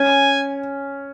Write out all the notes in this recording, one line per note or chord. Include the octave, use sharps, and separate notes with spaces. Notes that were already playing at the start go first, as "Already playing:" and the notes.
Already playing: C#4 G#5